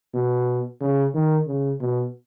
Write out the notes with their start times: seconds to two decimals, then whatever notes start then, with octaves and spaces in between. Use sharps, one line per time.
0.14 B2
0.80 C#3
1.14 D#3
1.47 C#3
1.80 B2